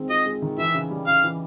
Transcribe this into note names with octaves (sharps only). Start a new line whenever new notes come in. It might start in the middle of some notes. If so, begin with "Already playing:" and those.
Already playing: D#3 G#3 C4
F4 D#5
G#3
D#3
E3 E5
C#3
G3
C#3 F5
E3